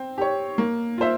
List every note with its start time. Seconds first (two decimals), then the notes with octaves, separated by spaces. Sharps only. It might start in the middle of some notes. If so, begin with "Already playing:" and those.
Already playing: C4
0.18 G4 C#5
0.58 A#3
0.98 F4 C5 E5